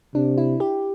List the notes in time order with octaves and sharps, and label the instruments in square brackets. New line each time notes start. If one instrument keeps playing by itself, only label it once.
[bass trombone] C3 [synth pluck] D4
[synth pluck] E4
G4